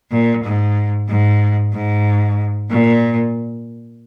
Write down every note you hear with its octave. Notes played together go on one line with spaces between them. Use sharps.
A#2
G#2
G#2
G#2
A#2